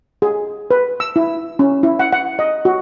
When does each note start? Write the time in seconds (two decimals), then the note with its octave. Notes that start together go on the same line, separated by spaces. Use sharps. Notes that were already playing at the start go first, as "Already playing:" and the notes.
0.22 G#4
0.71 B4
1.00 E6
1.16 E4
1.59 C#4
1.83 E4
1.99 F#5
2.12 F#5
2.39 D#5
2.65 F#4